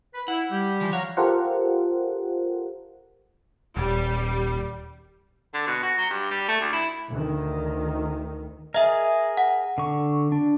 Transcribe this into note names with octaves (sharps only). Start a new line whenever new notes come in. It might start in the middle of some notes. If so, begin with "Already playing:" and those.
B4 B5
E4 F#5
G3 G4
E3 F3
C#5 F5 F#5 A#5
F4 G4 A4 A#4 C5 F#5
D#1 G3
D3
B2
F#4
F#3
G2
G3
A3
D2
E4
D2 D#3
G#4 A#4 D#5 E5
F#5
D3 C#6
D4